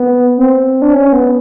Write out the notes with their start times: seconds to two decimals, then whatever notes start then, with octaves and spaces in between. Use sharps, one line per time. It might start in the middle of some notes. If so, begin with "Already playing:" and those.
Already playing: B3
0.38 C4
0.82 D4
0.93 C#4
1.13 B3